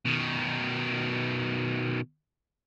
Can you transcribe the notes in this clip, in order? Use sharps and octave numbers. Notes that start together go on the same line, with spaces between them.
B2 D#3